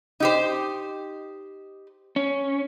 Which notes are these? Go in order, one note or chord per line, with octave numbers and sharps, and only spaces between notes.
D#4 G4 C5
C#4